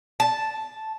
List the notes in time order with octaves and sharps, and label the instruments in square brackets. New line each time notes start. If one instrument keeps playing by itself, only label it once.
[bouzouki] A5